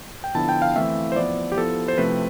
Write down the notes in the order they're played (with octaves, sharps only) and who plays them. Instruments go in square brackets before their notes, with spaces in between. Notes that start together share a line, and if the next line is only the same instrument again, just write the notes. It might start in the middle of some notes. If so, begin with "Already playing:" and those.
[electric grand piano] G5
D3 F3 B3 E4 A5
G5
F5
E3 A3 C4 E4 E5
C5
F3 B3 E4 D5
G4
F3 B3 E4 A4
C5
C3 F3 A3 C4 E4 B4